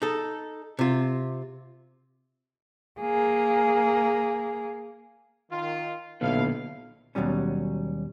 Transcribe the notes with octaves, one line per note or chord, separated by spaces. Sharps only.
D#4 A4
C3 F4
A#3 G#4
D#3 F4
B1 A#2 D3 B3 E4 F5
D#2 B2 F#3 G3 C#4